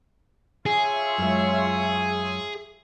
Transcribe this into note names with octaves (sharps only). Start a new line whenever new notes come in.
F4 G#4 C#5 E5
F#2 G#3